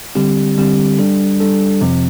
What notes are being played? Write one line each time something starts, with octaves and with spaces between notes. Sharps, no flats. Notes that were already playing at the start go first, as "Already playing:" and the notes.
D3 G3 C4 G4
D3 G3 C4 G4
G3 D4 A4
G3 D4 A4
F2 C3 F3 C4